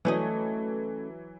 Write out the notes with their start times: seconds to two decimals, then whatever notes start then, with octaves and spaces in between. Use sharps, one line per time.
0.05 E3 F#3 A3 C#4 D#5